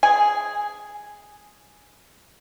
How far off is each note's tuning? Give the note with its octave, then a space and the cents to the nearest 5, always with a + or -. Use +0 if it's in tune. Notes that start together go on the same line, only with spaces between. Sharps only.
G#4 +0 G#5 -5